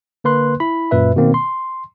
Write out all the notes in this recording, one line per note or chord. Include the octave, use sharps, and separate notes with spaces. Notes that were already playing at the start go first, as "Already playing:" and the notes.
D3 A#3 B4 C6 F#6
E4 B5
F#2 A#2 B4 E5
B2 D#3 A#3 C4
C6